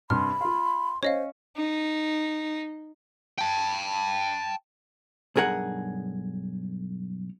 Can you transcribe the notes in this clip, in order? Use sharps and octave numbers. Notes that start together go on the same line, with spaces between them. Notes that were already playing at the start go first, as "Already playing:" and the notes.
G2 C3 B5 C6 F6
F4 F5 C6
C#4 C5 C#5 D#5 F5
D#4
G5 A5
B1 G2 G#4 A#4 F#5